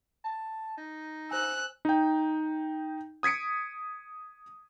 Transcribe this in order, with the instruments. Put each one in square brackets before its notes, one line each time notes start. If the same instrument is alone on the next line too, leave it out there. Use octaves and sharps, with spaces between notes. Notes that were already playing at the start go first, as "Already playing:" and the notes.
[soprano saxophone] A5
D#4
[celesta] C5 G#5 [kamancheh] E6 F#6
[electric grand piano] D#4 G5
D#6 G#6 B6 C#7 D7